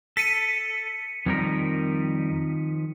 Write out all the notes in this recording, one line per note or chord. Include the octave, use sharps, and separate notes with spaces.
A4 B6 C#7 D#7
F2 D#3 F3 G3 A#4